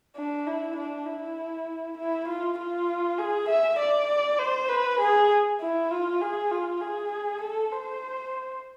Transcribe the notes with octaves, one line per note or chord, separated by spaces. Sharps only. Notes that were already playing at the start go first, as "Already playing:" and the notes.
D4
E4
D4
E4
E4
F4
F4
G#4
E5
D5
C5
B4
G#4
E4
F4
G#4
F4
G#4
A4
C5